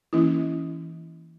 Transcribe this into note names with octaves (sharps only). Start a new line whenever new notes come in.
E3 A#3 C#4 E4